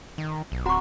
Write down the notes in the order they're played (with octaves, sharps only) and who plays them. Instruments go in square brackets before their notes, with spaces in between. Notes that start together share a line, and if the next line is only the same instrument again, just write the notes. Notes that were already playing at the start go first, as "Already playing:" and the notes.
[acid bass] D#3
B1
[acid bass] D1 [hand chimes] C4 F#5 A#5 [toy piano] F#4 C#6